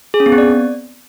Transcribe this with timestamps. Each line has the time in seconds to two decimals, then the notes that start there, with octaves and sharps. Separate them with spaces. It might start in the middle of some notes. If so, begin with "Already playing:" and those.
0.14 G#4
0.20 C#4
0.26 B3
0.32 C4
0.38 D5